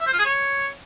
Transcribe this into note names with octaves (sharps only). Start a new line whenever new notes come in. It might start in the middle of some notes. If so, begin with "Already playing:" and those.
E5
C5
F4
G#4
C#5